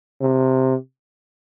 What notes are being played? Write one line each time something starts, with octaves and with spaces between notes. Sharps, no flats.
C3